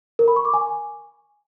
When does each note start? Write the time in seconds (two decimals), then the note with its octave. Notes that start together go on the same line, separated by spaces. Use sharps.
0.19 A#4
0.28 B5
0.36 C#6
0.45 D6
0.54 G#5